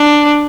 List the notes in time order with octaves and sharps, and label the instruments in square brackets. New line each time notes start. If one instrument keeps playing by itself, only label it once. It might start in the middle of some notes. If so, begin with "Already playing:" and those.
Already playing: [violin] D4